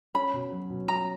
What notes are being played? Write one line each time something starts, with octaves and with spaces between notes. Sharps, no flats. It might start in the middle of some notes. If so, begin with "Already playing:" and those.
C#4 B5
B2
F#3
B2
C#4 A#5